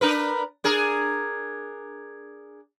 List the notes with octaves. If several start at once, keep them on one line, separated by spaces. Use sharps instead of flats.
D4 A#4 B4
D4 G#4 A#4